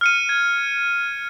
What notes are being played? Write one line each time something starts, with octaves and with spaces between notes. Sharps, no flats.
F6 C#7 D#7
G#6